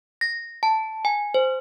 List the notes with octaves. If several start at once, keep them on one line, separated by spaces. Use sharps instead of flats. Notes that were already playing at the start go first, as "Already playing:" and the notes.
A#6
A5
G#5
C5